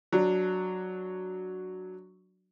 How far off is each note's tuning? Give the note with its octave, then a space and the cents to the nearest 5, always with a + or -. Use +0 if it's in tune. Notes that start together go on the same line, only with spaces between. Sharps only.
F#3 +0 D4 +5